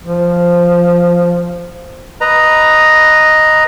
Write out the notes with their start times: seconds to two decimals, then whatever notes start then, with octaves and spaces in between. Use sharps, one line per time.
0.03 F3
2.21 B4 D#5 A#5